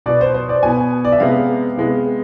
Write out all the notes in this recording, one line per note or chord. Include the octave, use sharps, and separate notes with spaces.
B2 B3 D5
C5
C5
D5
B2 B3 G#5
D5
E5
C3 G#3 B3 F5
C3 G#3 B3